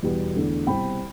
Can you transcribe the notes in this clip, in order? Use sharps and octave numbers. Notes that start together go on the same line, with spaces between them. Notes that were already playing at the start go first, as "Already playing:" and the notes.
E2 B2 G3 B3
E2 D3 A3
C2 B2 G3 C4 G5 B5